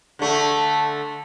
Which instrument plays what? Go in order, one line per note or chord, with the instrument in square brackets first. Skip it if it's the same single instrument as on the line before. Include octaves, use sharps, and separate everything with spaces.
[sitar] D3 A3